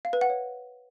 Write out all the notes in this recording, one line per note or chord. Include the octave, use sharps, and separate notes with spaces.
F5
B4
F#5
C#5